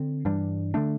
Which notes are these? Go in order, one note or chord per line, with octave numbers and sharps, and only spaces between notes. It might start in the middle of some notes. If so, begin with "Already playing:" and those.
Already playing: D3 C4
G2 E3 G3 D4
D3 A3 D4